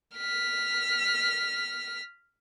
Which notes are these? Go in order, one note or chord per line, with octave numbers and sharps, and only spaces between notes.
F6 B6